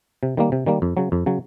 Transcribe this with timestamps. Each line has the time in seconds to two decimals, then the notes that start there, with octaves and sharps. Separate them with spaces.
0.23 C3
0.37 D#3 G3 A#3
0.52 C3
0.66 D#3 G3 A#3
0.82 F2
0.97 C#3 F#3
1.12 F2
1.26 C#3 F#3